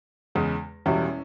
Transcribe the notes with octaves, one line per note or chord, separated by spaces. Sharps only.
E2 C#3 G#3
E1 E2 B2 G3 C#4 E4